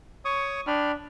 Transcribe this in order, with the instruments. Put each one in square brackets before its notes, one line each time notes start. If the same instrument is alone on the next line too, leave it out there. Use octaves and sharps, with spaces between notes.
[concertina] C#5 C#6 D#6
[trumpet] D4 [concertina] G5 B5 F6